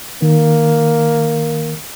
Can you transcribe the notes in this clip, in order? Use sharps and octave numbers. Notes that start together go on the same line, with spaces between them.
D#3 A#3